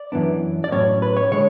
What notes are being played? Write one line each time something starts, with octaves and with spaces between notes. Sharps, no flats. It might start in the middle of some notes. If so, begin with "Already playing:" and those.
Already playing: D5
F#2 E3 B3 D4
D5
A2 F#3 C#4 C#5
B4
C#5
D3 G#3 C#5